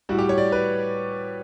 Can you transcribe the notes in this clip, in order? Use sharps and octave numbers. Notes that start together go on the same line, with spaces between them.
A2 G3 F#4
G4
C#5
D5
B4